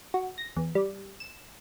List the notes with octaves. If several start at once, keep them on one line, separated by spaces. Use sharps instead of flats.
F#4
A#6
E2
G3
E7